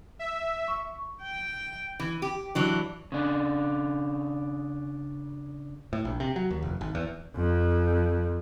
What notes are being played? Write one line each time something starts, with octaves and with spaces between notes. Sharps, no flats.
E5
C#6
G5
E3
G4
E3 F#3 D4
C#3 D4
A2
A#1
C3
F#3
D#2
F1
G#1
E2
F2